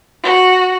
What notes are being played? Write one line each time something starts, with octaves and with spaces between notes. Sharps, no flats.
F#4